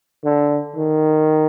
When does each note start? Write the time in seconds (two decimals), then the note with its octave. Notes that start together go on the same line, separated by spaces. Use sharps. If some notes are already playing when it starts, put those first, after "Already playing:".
0.24 D3
0.76 D#3